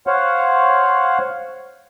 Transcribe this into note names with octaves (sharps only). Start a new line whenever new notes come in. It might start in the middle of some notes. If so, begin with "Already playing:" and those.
C5 C#5 F5 F#5